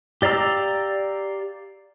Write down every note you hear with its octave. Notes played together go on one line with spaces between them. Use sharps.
G4 D5 F5 A#5 E6